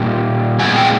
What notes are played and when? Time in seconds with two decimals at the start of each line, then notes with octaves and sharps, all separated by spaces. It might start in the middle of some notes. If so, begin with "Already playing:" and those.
Already playing: A#2 G3 A#3 G5 A5
0.59 A#2 F3 G#3 B3 F#5 G#5
0.75 F5 G5